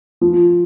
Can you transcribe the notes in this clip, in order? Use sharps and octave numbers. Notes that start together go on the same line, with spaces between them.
F3